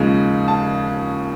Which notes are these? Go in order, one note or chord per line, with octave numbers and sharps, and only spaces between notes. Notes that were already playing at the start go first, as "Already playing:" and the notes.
Already playing: D#2 C#3 F3 G#3
A5